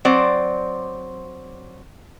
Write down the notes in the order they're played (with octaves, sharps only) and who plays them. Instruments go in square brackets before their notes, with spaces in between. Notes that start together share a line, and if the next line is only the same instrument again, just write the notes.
[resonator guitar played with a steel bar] F#3 C4 C5 D5